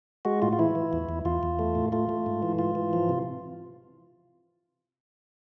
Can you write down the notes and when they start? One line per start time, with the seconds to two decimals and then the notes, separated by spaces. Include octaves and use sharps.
0.25 G#3 F#4
0.42 A2 F4
0.53 F4
0.59 E3 E4
0.75 E3
0.93 E2
1.09 E2
1.25 E2 F4
1.43 E2
1.59 A3
1.75 A2
1.92 A3 F4
2.09 A3
2.26 G#2
2.43 E3
2.59 G#2 F4
2.75 E3
2.93 F3
3.09 C3